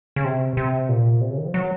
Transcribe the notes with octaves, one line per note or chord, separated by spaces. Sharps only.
C#3
C3
C3
A#2
C3
C#3
D#3
F3
F#3